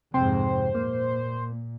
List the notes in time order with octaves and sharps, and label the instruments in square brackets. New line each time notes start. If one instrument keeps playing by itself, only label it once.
[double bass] F2 G#2 [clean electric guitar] C3 C4 G5 [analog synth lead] C5
[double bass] A#2 [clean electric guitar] A#3